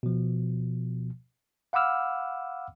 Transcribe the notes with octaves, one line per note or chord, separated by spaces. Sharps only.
B2 F3
F5 F#5 B5 D6 E6 F6